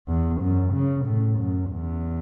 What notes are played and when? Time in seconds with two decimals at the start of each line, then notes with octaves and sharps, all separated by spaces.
0.08 E2
0.41 F#2
0.73 C#3
1.06 A2
1.39 F#2
1.71 E2